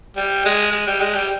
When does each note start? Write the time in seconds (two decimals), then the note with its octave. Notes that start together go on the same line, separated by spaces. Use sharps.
0.16 G3
0.45 G#3
0.72 G#3
0.87 G3
1.01 G#3
1.15 G3